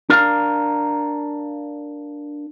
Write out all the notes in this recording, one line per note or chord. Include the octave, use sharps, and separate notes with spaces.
D4 A#4 D5 F5 F#5 A#5